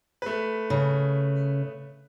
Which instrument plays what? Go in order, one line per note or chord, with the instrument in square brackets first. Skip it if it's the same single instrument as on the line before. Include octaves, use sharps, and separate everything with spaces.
[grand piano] A3 B4
[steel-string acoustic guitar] C#3